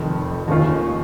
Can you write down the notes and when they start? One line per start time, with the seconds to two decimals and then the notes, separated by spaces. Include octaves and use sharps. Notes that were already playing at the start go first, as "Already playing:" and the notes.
Already playing: F1 F2 D#3
0.48 D#2 D#3 G#3 C#4 F4